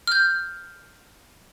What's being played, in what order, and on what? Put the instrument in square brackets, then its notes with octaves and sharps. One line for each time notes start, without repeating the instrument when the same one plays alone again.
[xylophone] F6 G6